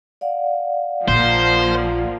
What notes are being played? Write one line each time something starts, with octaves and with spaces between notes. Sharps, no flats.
D5 F5 F#5
A#1 F3 A#3 C5